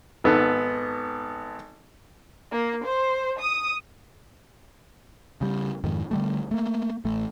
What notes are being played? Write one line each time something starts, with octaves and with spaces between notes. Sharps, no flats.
G#1 B3 A4
A#3
C5
D#6
C#3 G3
F2 G#2 D#3
D3 G3 A3
A3 A#3
A1 A3